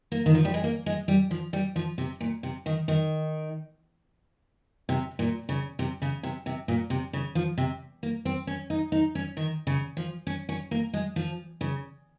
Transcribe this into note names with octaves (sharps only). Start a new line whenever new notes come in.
A#3
D#3
F3
G3
G#3
A#3
G#3
G3
F3
G3
F3
C3
A#2
C3
D#3
D#3
C3
A#2
C#3
C3
C#3
C3
C3
A#2
C3
C#3
F3
C3
A#3
C4
C#4
D#4
D#4
C#4
D#3
C#3
F3
C#4
C#4
A#3
G#3
F3
C#3